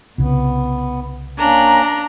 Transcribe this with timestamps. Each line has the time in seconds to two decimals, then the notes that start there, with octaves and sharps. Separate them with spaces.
0.18 C2 C#3 B3
1.38 A#3 C#4 D4 A#5